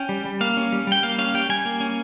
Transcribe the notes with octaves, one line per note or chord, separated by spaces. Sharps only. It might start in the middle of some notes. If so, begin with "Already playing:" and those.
Already playing: C#4 G5
G3
G3
A#3 F5
C#4
G3
G3 G5
A#3 F5
C#4 F5
G3 G5
G3 G#5
A#3
C#4